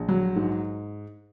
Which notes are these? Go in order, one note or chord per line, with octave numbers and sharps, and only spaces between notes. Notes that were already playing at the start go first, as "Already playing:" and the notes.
Already playing: A#1
F#3
G#2